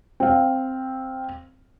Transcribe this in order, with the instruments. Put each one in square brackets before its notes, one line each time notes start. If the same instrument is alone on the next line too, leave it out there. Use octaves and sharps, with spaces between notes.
[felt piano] C4 F5